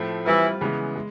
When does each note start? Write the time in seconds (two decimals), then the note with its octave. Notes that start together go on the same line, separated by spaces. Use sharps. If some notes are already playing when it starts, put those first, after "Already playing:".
Already playing: A2 F3 A3 C4
0.26 E3 G3 C4 E4 F4
0.61 C#3 E3 G#3 B3
0.95 G#3